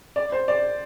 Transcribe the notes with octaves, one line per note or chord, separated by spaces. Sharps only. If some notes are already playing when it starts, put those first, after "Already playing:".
D5
C5
D5